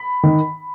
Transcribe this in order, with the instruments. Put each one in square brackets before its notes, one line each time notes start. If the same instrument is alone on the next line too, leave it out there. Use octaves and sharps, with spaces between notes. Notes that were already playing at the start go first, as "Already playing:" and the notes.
Already playing: [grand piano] B5
D#3